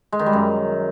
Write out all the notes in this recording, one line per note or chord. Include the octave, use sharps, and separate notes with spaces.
G#3
D#3
G3
F#2